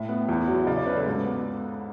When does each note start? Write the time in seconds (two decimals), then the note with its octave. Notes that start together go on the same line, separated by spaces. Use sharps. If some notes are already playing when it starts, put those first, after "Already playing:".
Already playing: A2 E5
0.09 B3
0.29 E2
0.48 F#3
0.67 C#3 D5
0.77 D5
0.86 C#4 B4
0.96 A4
1.06 G#2
1.25 B3